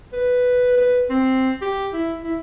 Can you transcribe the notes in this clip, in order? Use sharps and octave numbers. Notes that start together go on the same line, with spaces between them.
B4
B4
C4
G4
E4
E4